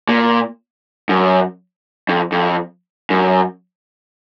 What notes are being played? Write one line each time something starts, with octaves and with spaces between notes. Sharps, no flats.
A#2
F#2
F2
F2
F#2